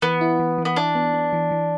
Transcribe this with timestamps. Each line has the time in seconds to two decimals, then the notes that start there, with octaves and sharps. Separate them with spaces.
0.02 E3 B3
0.21 E4
0.40 E3
0.58 E3
0.65 B3
0.76 D4 E4
0.95 B3
1.14 B3
1.33 E3
1.51 E3